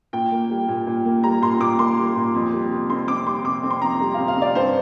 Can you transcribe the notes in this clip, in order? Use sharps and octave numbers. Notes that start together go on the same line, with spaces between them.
A#2 G5
A#3
G3
A#2
A#2
A#3
G3 A#5
A#2 C6
A#2 D6
A#3 C6
G3
A#2
F2
G3
C3
C4 C6
F2 D6
G3 C6
C3 D6
C4
C6
F2 A#5
G3
C3 F5
F5
C4 D5
G2 C5